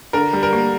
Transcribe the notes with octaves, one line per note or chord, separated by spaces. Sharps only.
D3 A#4
G3
A#4
A#3